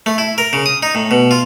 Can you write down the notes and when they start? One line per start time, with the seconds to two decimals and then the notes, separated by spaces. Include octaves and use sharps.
0.06 A3
0.18 E4
0.38 A#4
0.53 C#3
0.66 D#6
0.83 D#4
0.95 A2
1.11 B2
1.31 F4